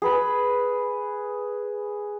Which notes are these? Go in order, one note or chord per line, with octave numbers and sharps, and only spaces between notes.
G#4 B4 B5